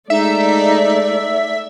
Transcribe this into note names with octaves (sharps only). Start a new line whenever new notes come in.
G#3 A3 D#4 D5 E5